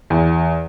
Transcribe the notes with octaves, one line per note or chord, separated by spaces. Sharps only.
E2